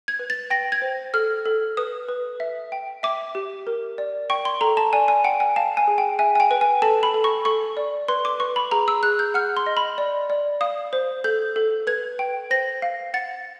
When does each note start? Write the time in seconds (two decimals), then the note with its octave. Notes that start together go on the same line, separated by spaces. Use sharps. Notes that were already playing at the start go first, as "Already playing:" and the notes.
0.08 G#6
0.19 B4
0.30 A6
0.50 G5 A#6
0.72 G#6
0.82 C5
1.14 A4 F6
1.46 A4
1.77 B4 D#6
2.08 B4
2.40 E5
2.72 G5
3.03 E5 D6
3.35 G4
3.67 A#4
3.98 D5
4.30 G5 C#6
4.45 C6
4.61 A4 A#5
4.77 A5
4.93 D5 G#5
5.08 G#5
5.24 F#5 G5
5.40 G#5
5.56 F5 A5
5.77 G#5
5.88 G#4
5.98 G5
6.19 E5 G#5
6.35 G#5
6.40 G5
6.51 B4
6.61 G#5
6.82 A4 A5
7.03 B5
7.14 A4
7.24 C#6
7.45 A4 C#6
7.77 D5
8.08 B4 C6
8.25 D6
8.40 B4 C#6
8.56 B5
8.71 G#4 A#5
8.88 E6
9.03 G#4 F#6
9.19 G6
9.34 F#5 F6
9.57 C6
9.66 D#5
9.77 B5
9.98 D5
10.30 D5
10.61 F5 D#6
10.93 C5
11.24 A4 G6
11.56 A4
11.87 B4 G#6
12.19 G5
12.50 C5 A#6
12.82 F5
13.14 F#5 A6